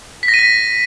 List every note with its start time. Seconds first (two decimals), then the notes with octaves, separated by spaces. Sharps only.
0.23 B6
0.28 A#6
0.34 D#7
0.39 B6